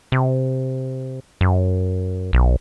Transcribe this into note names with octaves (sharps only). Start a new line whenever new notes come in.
C3
F#2
B1